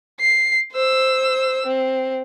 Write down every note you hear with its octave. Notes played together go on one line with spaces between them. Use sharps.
C7
C5 E6
C4